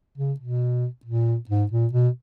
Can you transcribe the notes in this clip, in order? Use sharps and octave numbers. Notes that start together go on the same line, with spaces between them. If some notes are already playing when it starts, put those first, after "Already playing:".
C#3
B2
A#2
G#2
A#2
B2